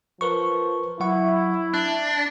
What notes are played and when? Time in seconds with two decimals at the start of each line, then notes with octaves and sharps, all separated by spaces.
0.21 F3 A#4 B4 C#6
1.00 F#3 E4 F#5 C#6
1.74 D4 F#6